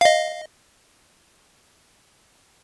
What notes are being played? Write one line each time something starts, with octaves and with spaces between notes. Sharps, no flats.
D#5 F5